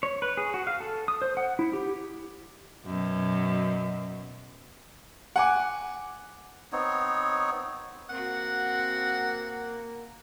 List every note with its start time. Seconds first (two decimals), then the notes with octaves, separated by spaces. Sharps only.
0.03 C#5
0.22 B4
0.37 G#4
0.54 F#4
0.67 F5
0.80 A4
1.08 D#6
1.22 C5
1.37 F#5
1.59 E4
1.73 G4
2.85 F#2 B2
5.36 F#5 G#5 D6
6.72 B3 C4 D#4 C#5
8.10 A#3 C4 F#4 F#5